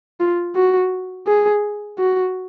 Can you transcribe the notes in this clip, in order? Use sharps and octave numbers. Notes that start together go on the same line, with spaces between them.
F4
F#4
G#4
F#4